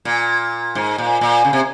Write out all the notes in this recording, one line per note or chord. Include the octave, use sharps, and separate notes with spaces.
A#2
G#2
A#2
A#2
C#3
C3